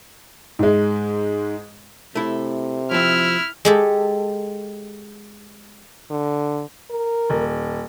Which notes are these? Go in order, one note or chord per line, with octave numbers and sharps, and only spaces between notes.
G#2 G#3
C3 A3 E4
F3 C4 E4 F6
G#3 G4 A4
D3
A#4
D#1